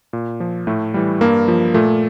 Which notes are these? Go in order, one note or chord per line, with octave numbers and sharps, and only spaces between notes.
A#2
F3
A2 A3
E3 G3
G2 A#3
F3
A#2 A3